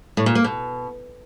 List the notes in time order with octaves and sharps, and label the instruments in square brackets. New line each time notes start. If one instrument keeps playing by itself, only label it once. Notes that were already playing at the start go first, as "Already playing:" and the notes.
[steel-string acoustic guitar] A2
A#2
A#3
B2